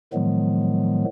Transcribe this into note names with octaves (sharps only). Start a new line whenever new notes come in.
A2 D#3 F3 F#3 G#3 B3